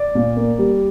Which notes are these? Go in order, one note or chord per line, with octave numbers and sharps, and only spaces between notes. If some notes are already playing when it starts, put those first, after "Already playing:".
Already playing: D5
A#2
A#3
G3